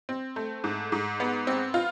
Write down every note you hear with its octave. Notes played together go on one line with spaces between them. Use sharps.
C4
A3
G#2
G#2
B3
C4
F4